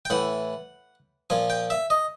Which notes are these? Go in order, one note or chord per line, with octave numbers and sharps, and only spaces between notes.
G5
A2 E3 F#5
A#2 F3 G#5
G5
E5
D#5